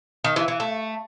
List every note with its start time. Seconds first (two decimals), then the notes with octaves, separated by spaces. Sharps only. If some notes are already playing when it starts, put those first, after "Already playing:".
0.24 D#3
0.36 E3
0.48 E3
0.60 A3